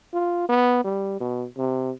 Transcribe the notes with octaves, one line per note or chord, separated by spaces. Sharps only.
F4
B3
G3
B2
C3